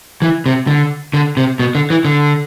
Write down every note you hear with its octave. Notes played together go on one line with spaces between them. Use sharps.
E3
C3
D3
D3
C3
B2
D3
E3
D3